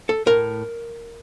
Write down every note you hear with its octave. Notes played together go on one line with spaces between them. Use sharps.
A4
A2 A#4